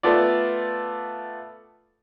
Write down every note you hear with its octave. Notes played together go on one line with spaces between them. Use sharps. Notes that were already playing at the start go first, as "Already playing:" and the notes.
A3 B3 F4 D5